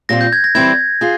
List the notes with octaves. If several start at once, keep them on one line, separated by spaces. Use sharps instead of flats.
A#2 G3 C4 F4 A#6
G6
G#6
A#6
E3 G3 C4 E4 G#6
F4 G#4